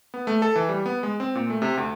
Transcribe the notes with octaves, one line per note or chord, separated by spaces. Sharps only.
B3
A3
A4
E3
G3
B3
G#3
C4
A#2
A3
C3
D2